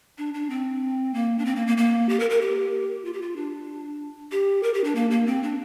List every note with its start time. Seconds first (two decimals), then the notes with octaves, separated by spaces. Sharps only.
0.18 D4
0.34 D4
0.50 C4
1.14 A#3
1.38 D4
1.45 C4
1.56 A#3
1.67 A#3
1.77 A#3
2.09 G4
2.20 A#4
2.30 A#4
2.41 G4
3.05 F4
3.13 G4
3.22 F4
3.36 D4
4.32 G4
4.63 A#4
4.74 G4
4.84 D4
4.95 A#3
5.11 A#3
5.27 C4
5.43 D4